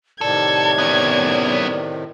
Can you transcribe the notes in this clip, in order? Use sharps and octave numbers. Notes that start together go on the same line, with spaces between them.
A2 C3 D#3 A4 D5 G#6
B3 C#4